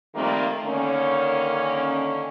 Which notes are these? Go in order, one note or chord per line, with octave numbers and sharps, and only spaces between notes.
D#3 F3 G3 A3 A#3 C4
D3 D#3 A#3 C#4